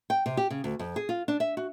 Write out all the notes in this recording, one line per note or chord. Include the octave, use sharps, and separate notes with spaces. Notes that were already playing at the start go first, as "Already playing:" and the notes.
G5
C3
G4
C#3
D2
F2
G#4
F4
D4
E5
F#4